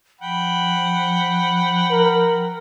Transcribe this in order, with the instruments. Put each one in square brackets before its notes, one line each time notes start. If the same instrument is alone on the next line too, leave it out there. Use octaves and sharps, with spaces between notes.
[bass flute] F3 [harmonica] F#5 G5 B5
[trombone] A#4